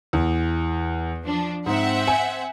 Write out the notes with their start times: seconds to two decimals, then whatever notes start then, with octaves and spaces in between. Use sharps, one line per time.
0.13 E2
1.23 F3 D4
1.66 G#2 C4 E5 F#5
2.07 G#5